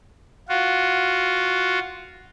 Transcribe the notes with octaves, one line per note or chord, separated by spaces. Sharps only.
F4 F#4